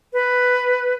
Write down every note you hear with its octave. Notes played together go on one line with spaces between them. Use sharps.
B4